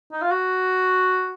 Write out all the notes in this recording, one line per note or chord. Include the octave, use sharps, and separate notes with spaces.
D#4
F4
F#4